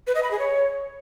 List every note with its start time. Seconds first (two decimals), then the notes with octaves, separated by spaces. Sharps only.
0.07 B4
0.15 D#5
0.23 B5
0.31 G#4
0.39 C#5